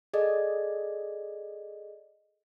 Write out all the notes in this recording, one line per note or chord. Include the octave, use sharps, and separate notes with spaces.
G#4 A4 D5 D#5